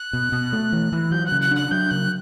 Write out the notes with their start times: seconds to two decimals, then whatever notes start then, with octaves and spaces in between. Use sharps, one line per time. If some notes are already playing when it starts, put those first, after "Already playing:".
Already playing: F#6
0.13 B2
0.32 B2
0.53 A3
0.73 E3
0.92 E3
1.11 F#3 G6
1.26 F#6
1.32 C#3
1.41 F#6
1.51 D4 F#6
1.71 F#3 G6
1.91 C#3 F#6